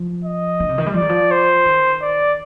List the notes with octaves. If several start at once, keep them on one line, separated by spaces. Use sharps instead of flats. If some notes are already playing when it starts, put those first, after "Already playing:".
Already playing: F3
D#5
D3
C3
D#3
G3
F3 D5
D#3
F3
C5
D#3
D5